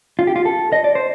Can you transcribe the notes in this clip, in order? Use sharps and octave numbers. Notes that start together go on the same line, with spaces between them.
F4
G4
F4
A4
D#5
D5
C5